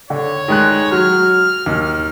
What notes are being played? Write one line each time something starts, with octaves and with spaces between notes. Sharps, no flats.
D3 C#5
D#3 G#3 F#6
F#3 F6
D#2